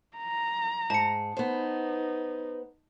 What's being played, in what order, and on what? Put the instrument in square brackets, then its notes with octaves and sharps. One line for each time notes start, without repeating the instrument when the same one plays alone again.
[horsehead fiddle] A#5
[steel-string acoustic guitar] G#2 G#4 [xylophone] A5 C#7
[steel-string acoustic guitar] B3 C5 [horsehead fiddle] D#4